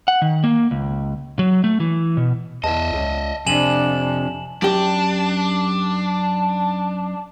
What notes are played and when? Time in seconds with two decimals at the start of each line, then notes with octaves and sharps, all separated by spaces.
0.08 F#5
0.22 D#3
0.44 A#3
0.71 C#2
1.39 F#3
1.64 A3
1.80 E3
2.17 B2
2.64 E2 D#5 E5 A5
2.92 C#2
3.46 F2 C3 D4 G#5 E7 F#7
4.62 F#2 D4 G4